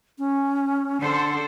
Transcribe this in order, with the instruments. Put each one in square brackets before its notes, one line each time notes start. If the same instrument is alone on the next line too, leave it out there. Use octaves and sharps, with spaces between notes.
[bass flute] C#4
[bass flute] D3 [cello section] D4 A4 C5